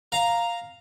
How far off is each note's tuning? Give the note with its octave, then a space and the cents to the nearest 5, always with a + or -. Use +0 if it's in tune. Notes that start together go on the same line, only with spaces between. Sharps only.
F5 +0 A#5 +0